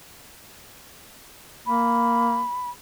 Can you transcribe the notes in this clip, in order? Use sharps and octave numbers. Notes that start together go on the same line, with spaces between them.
A#3 B5